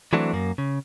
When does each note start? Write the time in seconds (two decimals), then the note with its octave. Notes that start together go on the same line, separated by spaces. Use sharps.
0.13 E3 F#3 A3 C4 D4
0.33 F#2 A#3
0.58 C#3